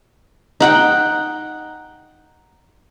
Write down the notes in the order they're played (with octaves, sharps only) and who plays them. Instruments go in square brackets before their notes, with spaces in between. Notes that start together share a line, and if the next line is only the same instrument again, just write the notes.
[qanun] D#4 F#5 G5